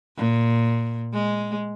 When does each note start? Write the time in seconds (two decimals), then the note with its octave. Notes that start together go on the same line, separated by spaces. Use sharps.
0.17 A#2
1.13 G#3